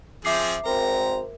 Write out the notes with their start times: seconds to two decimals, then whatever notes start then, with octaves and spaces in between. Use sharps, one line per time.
0.25 F3 C4 G#4 E5 D6 C7
0.66 G#1 C4 A#4 A#5